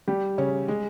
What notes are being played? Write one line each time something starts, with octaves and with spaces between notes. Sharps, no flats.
G3 G4
C#3 C#4
G#3